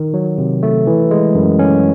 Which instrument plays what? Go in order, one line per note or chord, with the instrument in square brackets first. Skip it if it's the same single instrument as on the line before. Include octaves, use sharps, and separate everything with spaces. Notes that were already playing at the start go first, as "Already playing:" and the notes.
Already playing: [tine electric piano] D#3
F#3
C3
A3
E3
G#3
F#2
C#4